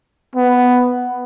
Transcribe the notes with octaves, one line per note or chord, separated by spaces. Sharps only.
B3